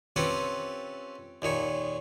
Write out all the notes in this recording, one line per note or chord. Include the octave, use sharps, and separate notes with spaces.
C4 C#4 F4 G4 A4 B4
D#2 A#2 D#4 C#5